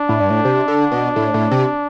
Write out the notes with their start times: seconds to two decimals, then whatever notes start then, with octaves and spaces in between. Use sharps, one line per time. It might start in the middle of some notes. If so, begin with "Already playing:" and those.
Already playing: D4
0.09 A2
0.20 G2
0.30 A2
0.45 C3
0.68 D3
0.92 B2
1.16 A2
1.34 A2
1.51 C3